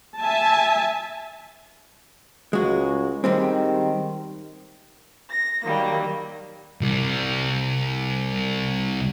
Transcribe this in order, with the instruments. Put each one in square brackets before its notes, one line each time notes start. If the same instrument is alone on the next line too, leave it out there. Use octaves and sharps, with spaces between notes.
[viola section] E5 G#5 A5
[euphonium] C#2 [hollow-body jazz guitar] G#3 F#4
[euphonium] D#3 [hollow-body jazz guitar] G3 G#3 C4
[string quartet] A#6
D#3 F#3 G3 A#3
[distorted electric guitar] C2 G3